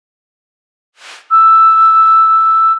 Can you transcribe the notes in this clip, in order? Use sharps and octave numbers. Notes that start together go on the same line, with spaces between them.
E6